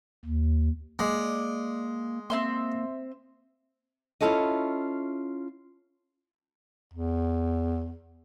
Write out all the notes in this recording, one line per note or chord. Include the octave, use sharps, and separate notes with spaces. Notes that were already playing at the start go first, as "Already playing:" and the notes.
D#2
G#3 A#3 D5
A#3 C4 E5 C6
C#4 E4 F4 A4 C#5 D#5
E2